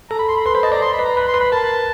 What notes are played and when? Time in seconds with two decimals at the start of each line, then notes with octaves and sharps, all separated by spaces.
0.10 A4 A#5
0.19 B5
0.28 C6
0.36 B5
0.46 B4 C6
0.54 C5 B5
0.63 D#5 A5
0.72 D5 A#5
0.82 C6
0.93 B5
0.99 B4
1.05 A#5
1.16 B4 B5
1.28 C6
1.34 B4
1.40 B5
1.52 A#4 A5